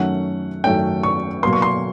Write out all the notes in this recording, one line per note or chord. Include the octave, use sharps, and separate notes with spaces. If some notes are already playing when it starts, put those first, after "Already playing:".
Already playing: F#2 D#3 F#3 A3 C#4 F#5
F#2 D#3 F#3 A3 C#4 G5
C#6
B2 F#3 A#3 C6
C#6
C6